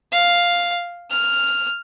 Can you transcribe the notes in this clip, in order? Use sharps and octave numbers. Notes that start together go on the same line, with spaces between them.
F5
F6